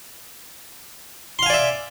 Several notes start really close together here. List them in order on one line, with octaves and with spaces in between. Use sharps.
C6 F5 G#5 D5 E5